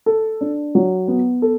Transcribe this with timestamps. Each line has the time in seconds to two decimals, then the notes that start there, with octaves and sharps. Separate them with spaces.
0.06 A4
0.41 D4
0.75 F#3
1.08 B3
1.42 A4